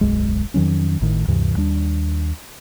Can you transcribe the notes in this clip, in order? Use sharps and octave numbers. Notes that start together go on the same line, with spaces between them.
D1 B1 F#2 G#3
F2 D#3 F#3 C#4
G#1 A2 D#3
D2 G2 C3 E3
D#2 G3 D4